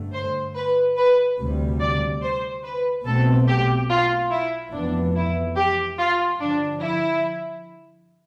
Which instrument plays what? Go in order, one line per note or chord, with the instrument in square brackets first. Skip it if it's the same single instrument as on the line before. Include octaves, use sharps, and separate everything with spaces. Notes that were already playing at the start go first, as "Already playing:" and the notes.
Already playing: [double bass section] G2 D3 A3
[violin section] C5
B4
B4
[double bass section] D2 C3 G3
[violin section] D5
C5
B4
[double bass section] B1 B2 A3 C4 [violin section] A4
[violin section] G4
F4
E4
[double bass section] F1 F2 E3 B3 [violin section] D4
[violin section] E4
G4
F4
[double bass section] G2 D3 F3 [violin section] D4
[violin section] E4